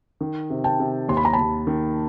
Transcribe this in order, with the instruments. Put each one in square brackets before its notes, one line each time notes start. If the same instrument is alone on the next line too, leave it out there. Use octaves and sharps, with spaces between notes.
[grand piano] D#3
C3
[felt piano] G5 A5
[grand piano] C3
[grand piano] D#2 [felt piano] C6
[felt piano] B5
A#5
[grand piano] D#2 [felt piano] A5 B5
[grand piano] D#3